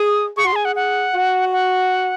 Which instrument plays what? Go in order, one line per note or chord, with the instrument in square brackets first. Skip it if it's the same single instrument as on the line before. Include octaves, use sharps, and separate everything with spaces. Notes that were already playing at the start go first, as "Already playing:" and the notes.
Already playing: [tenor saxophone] G#4 [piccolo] D#6
[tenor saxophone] G#4 [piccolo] C#6
[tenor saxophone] F#4 [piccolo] C6
[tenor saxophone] G#4 [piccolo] G#5
[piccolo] F#5
F#5
[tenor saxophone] F#4
[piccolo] F#5